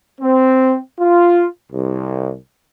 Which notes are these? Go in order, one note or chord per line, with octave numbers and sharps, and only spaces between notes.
C4
F4
C2